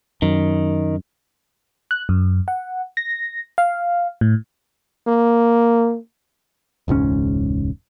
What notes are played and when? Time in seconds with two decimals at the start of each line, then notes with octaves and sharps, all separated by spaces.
0.22 F#2 D#3
1.91 F#6
2.09 F#2
2.48 F#5
2.97 A#6
3.58 F5
4.21 A2
5.07 A#3
6.88 E1 C#2 G#2 C#4